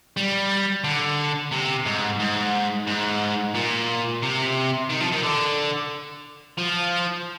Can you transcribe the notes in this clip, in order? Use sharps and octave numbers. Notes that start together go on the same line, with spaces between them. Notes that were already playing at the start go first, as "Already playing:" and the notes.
G3
D3
C3
G#2
G#2
G#2
A#2
C3
D#3
F3
D#3
D3
F3